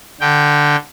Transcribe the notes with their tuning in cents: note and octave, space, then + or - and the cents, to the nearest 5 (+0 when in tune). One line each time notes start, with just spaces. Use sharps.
D3 +0 G5 +0